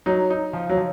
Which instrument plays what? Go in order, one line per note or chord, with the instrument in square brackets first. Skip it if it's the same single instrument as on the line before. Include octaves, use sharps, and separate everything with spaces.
[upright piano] F#3 [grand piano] D#4
[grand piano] D#4
F3
[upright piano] F#3
[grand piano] F3